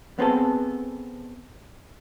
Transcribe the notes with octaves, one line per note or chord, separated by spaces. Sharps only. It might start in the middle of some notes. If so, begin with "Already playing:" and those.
B3 C4 G#4 A4